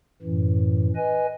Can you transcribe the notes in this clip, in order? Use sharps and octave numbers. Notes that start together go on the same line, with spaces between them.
F#2 A2 E3
B4 D#5 G#5